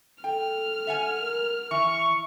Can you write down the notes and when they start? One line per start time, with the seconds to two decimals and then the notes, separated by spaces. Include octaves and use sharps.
0.24 A4 G5 F6
0.87 E5 F#5 G#5
1.21 A#4
1.71 E3 E5 C#6